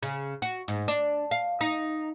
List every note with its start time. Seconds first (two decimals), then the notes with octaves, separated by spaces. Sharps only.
0.03 C#3
0.42 F#4
0.68 G#2
0.88 D4
1.31 F5
1.61 D#4